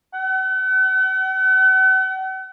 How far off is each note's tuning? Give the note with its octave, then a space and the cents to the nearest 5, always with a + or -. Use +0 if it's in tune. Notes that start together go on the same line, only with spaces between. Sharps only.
F#5 +40